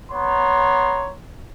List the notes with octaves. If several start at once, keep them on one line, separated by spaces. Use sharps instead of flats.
B3 C#5 A#5 C6